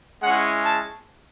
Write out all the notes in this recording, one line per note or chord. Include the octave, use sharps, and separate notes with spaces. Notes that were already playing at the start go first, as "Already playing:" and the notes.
G#3 C#4 E4 F#5
A5